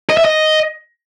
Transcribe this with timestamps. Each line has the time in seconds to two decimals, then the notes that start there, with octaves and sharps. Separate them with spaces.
0.10 D#5
0.17 E5
0.25 D#5